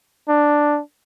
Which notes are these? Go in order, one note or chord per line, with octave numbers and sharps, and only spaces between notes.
D4